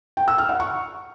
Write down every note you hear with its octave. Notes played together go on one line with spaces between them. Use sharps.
G5
E6
F6
F#5
C#6